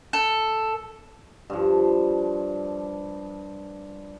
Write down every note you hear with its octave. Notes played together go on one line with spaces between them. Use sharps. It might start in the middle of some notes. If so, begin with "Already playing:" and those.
A4
G2 F3